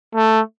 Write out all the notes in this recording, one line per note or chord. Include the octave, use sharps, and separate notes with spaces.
A3